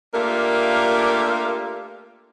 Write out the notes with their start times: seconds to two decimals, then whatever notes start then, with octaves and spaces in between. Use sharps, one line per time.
0.13 A3 A#3 D4 F4 G4 A#4